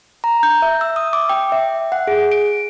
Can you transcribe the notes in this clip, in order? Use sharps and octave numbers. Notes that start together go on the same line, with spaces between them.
A#5
G6
E5
E6
D#6
D6
G5
E5
F#5
G#4
D7